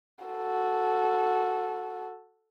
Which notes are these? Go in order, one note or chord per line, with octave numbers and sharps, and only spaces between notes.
F#4 A4